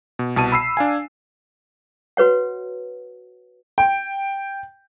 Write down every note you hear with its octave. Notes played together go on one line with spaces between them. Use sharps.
B2
C2 B2 A5 D#7
B5 E6 C7
D4 F5 G#5
F#4 B4 C#5 F#5
G5